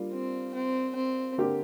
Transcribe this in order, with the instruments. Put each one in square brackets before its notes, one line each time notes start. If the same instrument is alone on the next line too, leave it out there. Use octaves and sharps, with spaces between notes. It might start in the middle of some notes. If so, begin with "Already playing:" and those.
Already playing: [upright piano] G3 A#3 D4 F4
[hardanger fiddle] C4
C4
C4
[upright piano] D3 A#3 G4 A#4